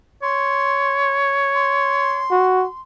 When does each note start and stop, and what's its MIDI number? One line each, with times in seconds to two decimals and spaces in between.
0.23 2.26 73
0.23 1.18 84
1.54 2.81 84
2.31 2.66 66